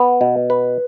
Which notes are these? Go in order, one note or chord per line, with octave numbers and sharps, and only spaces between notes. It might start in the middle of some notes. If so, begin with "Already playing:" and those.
Already playing: B3
B2
B4